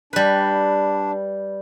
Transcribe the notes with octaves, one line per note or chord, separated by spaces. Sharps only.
G3 D4 B4